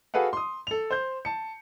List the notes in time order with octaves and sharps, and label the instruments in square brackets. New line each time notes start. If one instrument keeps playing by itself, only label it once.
[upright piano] F#4 G#4 A4 B4 F5 F#5
C6 D#6
A4 F7
C5 G6
A5 C#7